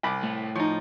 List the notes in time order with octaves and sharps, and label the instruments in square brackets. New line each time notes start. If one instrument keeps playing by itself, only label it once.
[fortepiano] C2 B5 D6
[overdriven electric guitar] A2
[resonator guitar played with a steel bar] F3 D#4 [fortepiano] C#5